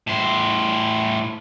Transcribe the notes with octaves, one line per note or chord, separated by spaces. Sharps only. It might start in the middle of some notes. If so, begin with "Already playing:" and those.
A2 C5